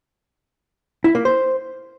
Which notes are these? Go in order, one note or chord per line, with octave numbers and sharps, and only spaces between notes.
E4
A#3
C5